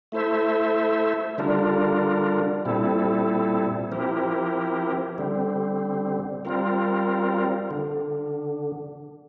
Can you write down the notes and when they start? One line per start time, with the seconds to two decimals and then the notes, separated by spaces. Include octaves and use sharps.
0.12 A3 E4 A4 C5 E5
1.38 D3 G3 D4 F4 A#4
2.65 A#2 G3 C4 E4 A4
3.91 F3 C4 E4 G4 A#4
5.18 D3 G3 C4
6.45 G3 C4 F4 A#4
7.71 D3